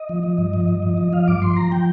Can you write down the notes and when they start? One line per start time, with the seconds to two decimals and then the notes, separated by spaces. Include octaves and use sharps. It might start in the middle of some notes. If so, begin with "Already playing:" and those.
Already playing: D#5
0.09 F3
0.23 F3
0.38 G2
0.54 F3
0.68 G2
0.83 F3
0.97 F3
1.13 F3 F5
1.28 G2 D6
1.42 F3 C6
1.57 F3 A#5
1.71 F3 G5